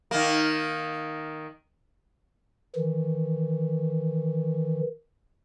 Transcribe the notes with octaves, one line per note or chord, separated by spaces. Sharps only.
D#3 A#3
D#3 E3